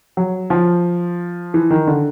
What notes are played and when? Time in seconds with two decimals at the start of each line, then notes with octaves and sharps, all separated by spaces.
0.17 F#3
0.50 F3
1.54 E3
1.70 D#3
1.87 D3